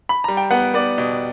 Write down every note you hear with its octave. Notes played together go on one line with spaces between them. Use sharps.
B5
G3 A#5
G5
B3 F#5
B3 D5
B2